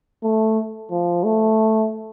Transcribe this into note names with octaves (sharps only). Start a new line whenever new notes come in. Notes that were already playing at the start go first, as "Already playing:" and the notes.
A3
F3
A3